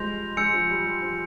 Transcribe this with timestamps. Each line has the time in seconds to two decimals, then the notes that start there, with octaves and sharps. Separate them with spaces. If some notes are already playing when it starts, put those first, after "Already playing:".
Already playing: F3 G3 G#3 C6 G6 A#6 F7
0.37 G#3 G#5 E6 G6 C#7
0.53 F3
0.70 G3
0.86 G3
1.02 F3